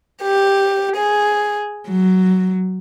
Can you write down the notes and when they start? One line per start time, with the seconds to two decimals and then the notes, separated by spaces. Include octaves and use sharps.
0.24 G4
0.96 G#4
1.89 F#3